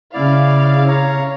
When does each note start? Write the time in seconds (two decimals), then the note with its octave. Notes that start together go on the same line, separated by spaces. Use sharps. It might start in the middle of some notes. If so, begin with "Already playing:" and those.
0.14 C#3 E4 D5 F5
0.88 C#5 A#5